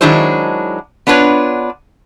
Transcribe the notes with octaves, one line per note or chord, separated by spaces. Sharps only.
D#3 F#3 G#3 D4 E4 C5
B3 D4 F4 B4 C#5